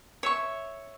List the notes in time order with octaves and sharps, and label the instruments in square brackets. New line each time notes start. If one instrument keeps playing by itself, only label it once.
[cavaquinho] C#5 E5 C#6